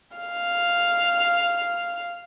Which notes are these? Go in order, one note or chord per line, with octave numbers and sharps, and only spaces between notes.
F5